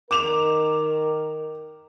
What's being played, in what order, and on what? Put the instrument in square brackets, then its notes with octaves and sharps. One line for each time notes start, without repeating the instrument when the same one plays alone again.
[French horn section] D#3 A#4 [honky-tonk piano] D6 E7 F7